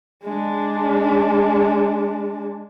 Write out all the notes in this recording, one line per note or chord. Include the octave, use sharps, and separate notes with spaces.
G#3 D4